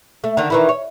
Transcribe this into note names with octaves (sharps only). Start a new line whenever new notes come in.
A3
D3 D#3
D#3 E3 E4
C#5